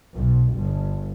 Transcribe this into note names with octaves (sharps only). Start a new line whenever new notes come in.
B1
G1